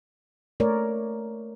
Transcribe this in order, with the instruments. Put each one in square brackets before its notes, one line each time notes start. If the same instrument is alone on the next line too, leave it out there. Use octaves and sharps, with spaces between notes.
[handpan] A3 A#4 C#5 D5